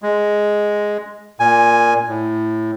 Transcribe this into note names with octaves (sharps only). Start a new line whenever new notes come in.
G#3
A#2 G#5
A2